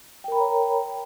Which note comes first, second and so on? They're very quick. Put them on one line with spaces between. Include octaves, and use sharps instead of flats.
G5 A#4 B5 A#5 C#5